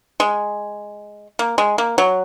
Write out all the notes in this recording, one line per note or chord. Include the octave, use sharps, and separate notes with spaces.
G#3
A#3
G#3
A#3
F#3